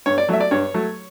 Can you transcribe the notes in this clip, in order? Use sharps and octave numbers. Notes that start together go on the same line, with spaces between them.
G2 C#5
D5
F#3 A3 E5
D5
G2 C#5
F#3 A3